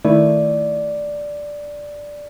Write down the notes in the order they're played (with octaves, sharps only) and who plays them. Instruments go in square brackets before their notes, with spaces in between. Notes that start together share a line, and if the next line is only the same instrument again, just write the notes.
[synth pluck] D#3 A3 E4 [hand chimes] D5